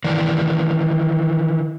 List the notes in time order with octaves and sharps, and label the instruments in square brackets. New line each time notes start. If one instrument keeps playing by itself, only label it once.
[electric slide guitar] D#3 E3 D5